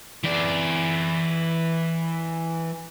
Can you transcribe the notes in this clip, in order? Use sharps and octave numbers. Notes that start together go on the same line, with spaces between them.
E3 D5